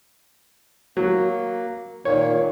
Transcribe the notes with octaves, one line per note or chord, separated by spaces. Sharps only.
F#3 A#3
A#2 D#3 A#3 C#5